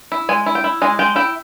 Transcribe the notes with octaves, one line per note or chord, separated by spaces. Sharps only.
E4
G#3 G#5
E4
G5
E4
G#3 G#5
G#3 G5
E4 G5